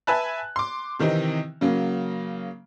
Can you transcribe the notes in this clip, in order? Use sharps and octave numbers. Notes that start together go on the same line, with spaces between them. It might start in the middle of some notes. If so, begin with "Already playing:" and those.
B4 E5 G#5 A5 B5 F#6
C6 D6
C3 D#3 E3 C4 D#4
C#3 F#3 A#3